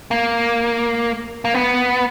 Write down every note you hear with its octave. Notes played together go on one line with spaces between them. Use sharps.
A#3
A#3
B3